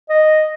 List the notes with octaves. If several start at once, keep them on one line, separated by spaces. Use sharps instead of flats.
D#5